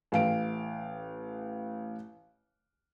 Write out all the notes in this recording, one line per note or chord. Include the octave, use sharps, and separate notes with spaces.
A1 F5 D7